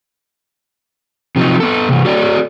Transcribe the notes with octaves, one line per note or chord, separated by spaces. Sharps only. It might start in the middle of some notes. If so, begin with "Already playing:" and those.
C3 F3 F#3 D#4
B3 A4
C3 E3
F#4 A4 C#5 D5